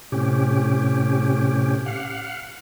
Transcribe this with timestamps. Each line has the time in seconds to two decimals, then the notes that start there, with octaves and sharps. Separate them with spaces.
0.12 A2 C3 C#4 G4
1.86 F5 F#5